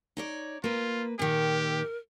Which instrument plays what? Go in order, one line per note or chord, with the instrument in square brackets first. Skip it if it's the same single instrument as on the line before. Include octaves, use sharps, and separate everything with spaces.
[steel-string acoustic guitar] D#4 C#5 D5
[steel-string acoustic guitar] A#3 B4 [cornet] F4
[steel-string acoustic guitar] A#2 D#3 [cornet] G4 [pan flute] A#4